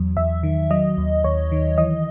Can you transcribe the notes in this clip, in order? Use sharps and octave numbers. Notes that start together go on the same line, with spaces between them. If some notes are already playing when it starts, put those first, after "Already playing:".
Already playing: E2 F#3
E2 E5
D#3
F#3 D#5
D#2
D#2 C#5
D#3
E3 D#5